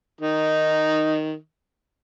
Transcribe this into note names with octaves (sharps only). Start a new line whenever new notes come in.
D#3 D#4